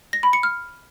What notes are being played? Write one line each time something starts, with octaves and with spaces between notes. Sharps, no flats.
A#6
B5
C#7
F6